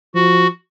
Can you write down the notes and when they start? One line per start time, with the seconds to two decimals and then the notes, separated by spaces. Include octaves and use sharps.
0.14 F3 F#4